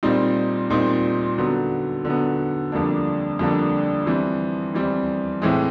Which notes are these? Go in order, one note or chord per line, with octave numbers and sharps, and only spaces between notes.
A#2 G3 C4 D#4
A#2 G3 C4 D#4
D3 F#3 B3
D3 F#3 B3
F2 D3 G3 A#3 D4
F2 D3 G3 A#3 D4
E3 G3 C4
E3 G3 C4
A2 E3 G#3 C4